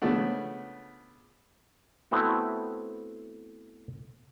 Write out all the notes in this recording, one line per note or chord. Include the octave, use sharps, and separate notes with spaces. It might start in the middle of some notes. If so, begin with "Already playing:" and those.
C#3 F3 G#3 A3 B3 D4
A3 B3 C4 E4 F#4